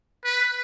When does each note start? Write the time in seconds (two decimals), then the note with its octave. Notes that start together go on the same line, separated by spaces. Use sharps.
0.25 B4